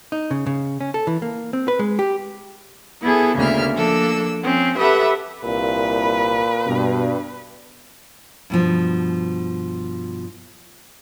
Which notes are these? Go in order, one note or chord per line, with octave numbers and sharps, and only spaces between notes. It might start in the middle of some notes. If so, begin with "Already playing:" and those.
D#4
C#3
C#3
C#4
A4
E3
A#3
C4
B4
G#3
G4
B3 E4 G#4 A4
D2 C#3 A#3 B3 E5 F6
F3 A#3 D4 A4 E6
F3 C4 C#4
G4 A4 B4 E5 F#5
C2 A#2 B4
G2 B2
G2 B2 F3